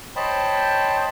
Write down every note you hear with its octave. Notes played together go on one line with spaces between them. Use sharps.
C5 C#5 D#5 G5 A5 B5